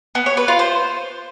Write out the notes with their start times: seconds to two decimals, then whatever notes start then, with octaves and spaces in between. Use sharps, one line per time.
0.15 B3
0.26 C#5
0.37 B4
0.48 F4
0.59 C5